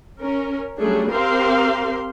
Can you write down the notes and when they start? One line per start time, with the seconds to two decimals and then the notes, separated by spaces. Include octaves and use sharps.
0.20 C#4 A#4
0.78 F#3 G3 A3 C#4 D4 G#4
1.11 C4 G4 A#4 C5 F5 C6